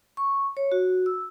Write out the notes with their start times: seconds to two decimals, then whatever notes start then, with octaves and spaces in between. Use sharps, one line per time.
0.17 C#6
0.57 C#5
0.72 F#4
1.06 E6